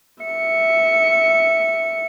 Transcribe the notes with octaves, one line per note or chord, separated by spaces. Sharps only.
E5 C#7